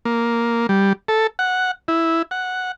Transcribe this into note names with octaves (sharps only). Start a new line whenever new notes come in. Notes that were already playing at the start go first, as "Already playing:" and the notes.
A#3
G3
A4
F#5
E4
F#5